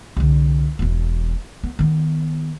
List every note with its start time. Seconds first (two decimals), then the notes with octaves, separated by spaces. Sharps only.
0.17 C2 D3
0.79 E1 E3
1.63 B3
1.79 D#3 B3